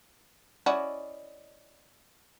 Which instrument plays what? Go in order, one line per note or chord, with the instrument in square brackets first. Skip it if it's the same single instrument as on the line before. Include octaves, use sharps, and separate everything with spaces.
[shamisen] C#4 E4 F#4 [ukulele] D5 D#5